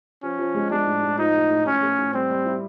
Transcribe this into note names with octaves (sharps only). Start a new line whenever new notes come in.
F3 C#4
F3
G#3
G#3 D4
A2
A2
F3 D#4
A2
A2
A2 C#4
A3
A2
G3 C4
G3
E4